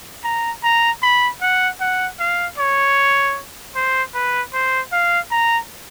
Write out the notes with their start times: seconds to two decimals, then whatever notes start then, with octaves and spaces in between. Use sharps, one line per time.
0.24 A#5
0.63 A#5
1.02 B5
1.41 F#5
1.80 F#5
2.19 F5
2.58 C#5
3.75 C5
4.14 B4
4.53 C5
4.92 F5
5.31 A#5